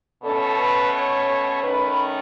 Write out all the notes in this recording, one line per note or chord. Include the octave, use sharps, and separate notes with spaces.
B2 A3 C#4 A4
B4
C#5
D#3 A3 C#4 B4